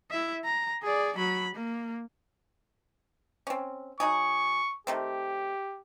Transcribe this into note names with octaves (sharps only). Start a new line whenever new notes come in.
E4 E5
A#5
G#4 D5
F#3 B5
A#3
C4 C#4
F#3 D#4 G#4 C#6
D#3 A3 C4 G4